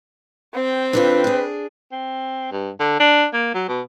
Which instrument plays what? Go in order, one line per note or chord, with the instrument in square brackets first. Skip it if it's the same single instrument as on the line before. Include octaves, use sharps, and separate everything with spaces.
[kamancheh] C4 G5
[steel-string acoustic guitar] D3 D4 F4 [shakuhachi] B4
[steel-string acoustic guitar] D4 G#4
[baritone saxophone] C4
G2
D3
D4
A#3
F#3
B2